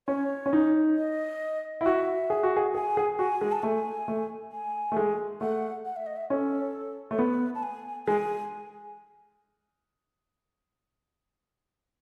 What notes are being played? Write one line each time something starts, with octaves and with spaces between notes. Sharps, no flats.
C#4 C#5
C#4
D#4
D#5
E4
F#4 E5
G#4
F#4
G#4
G#4 G#5
G#4
F#4 G#5
G#3
A5
A3 G#5
A3
G#5
A3
G#3
A3 F#5
F#5
E5
D#5
E5
C#4 A4
A3 C#5
B3 B4
A5
G#5
G#3 G#5